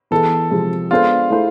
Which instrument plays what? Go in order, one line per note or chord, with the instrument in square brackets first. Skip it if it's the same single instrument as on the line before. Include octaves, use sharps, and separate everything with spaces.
[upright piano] E3 B3 E4 G#4 B4 [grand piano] A4
[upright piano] C3 F3 G#3
[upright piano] G#3 B3 D4 A4 C5 [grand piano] F4
[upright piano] A3 E4 G#4 C5